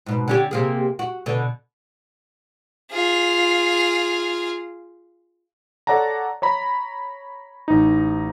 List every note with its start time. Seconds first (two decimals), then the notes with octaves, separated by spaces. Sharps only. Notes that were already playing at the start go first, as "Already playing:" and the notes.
0.06 G#2 B2
0.28 D3 C#4 G4
0.51 C3 A#3 G#4
0.99 F#4
1.26 B2 D3
2.91 F4 G#4
5.87 A4 C#5 D5 F#5 A5 A#5
6.42 C#5 A#5 B5
7.68 A1 D#4